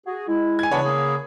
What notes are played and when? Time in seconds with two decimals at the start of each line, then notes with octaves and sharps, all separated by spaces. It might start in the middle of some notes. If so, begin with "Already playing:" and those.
0.06 F#4 G#4
0.28 G#3 E4
0.59 G#5 G#6
0.71 C#3 E3 B3 D4 C#5 F#5 B5
0.85 A#3 G#4